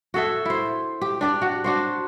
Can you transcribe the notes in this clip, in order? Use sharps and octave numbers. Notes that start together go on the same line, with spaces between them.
F#4 G#4 A4 E5
E4 C5
G4
D4 G4 D5
F#4 F#5
D4 F#4 C5